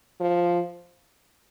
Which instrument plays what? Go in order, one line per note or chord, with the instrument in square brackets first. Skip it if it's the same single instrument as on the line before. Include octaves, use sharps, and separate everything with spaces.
[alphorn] F3